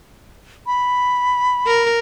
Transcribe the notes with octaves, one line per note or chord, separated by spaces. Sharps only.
B5
A#4